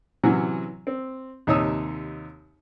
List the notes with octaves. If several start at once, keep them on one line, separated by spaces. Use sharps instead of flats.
C3 E3 F#3 C#4
C4
D#2 C3 D#4 C#5 D#6 E6